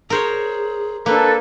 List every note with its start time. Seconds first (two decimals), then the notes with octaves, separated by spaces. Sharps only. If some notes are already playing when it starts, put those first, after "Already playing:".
0.10 G#4 A#4 C5 C#5
1.06 A#3 D4 A4 B4 F#6